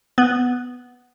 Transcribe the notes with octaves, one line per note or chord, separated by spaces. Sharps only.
B3